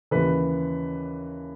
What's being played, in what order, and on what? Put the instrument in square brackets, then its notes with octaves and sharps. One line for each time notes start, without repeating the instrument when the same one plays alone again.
[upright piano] D#2 C#3 E3 B4